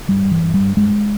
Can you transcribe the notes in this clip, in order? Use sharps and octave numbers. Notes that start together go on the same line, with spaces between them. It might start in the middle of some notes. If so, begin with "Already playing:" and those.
G2 G3
G2
E3
G2
G3
G2
G2 G#3